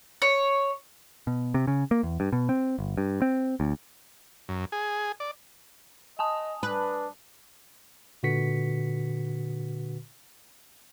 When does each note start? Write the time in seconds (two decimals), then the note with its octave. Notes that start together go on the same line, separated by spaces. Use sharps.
0.22 C#5
1.27 B2
1.54 C3
1.67 C#3
1.91 A#3
2.03 E2
2.20 G2
2.32 B2
2.49 C4
2.79 G1
2.97 G2
3.22 C4
3.60 D2
4.49 F#2
4.72 G#4
5.20 D5
6.19 D#5 G#5 A5 D#6
6.63 D4 B4
8.23 A#2 D3 F#4 B4 B6 C#7